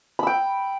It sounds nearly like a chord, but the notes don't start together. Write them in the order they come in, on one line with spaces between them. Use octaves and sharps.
B5 E6 G5